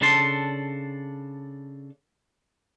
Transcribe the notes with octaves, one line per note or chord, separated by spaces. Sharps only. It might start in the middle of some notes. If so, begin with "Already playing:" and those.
C#3 D4 A4 A5 C6